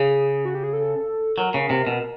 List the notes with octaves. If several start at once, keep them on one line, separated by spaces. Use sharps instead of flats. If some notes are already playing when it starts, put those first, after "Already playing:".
Already playing: C#3 G#4
F#4
G4
G#4
A4
F#3 A#4
C#3
C3
B2